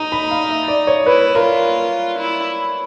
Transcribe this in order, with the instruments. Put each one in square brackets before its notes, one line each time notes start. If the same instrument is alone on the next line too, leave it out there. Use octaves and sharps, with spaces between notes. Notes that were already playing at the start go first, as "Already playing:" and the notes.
Already playing: [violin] D#4 [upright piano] A#5
[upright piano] B5
F5
E5
D5
C#5
[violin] E4 [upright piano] B4
[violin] F4 [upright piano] A#4
[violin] E4